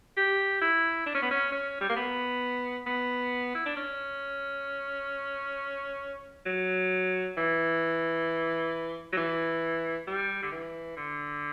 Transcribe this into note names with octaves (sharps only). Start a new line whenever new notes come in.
G4
E4
D4
C#4
B3
C#4
C#4
G3
A#3
B3
B3
E4
D4
C#4
F#3
E3
F#3
E3
G3
D3
E3
D3